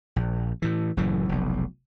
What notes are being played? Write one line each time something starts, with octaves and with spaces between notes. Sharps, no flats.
A#1
A2 E3
F#1 F#2 A2 E3
F1 B1